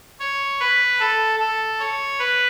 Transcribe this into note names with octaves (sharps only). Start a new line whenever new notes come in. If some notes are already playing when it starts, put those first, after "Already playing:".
C#5
B4
A4
A4
C#5
B4